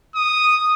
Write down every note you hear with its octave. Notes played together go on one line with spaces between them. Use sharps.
D#6